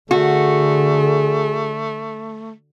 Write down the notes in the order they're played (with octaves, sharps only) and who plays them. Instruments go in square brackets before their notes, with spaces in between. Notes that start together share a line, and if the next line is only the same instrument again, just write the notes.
[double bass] D3 [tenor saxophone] A3 [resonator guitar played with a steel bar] F#4 [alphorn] G#4